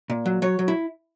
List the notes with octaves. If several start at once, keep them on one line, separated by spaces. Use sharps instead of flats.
A#2
F#3
F#3 C#5
F#3
E4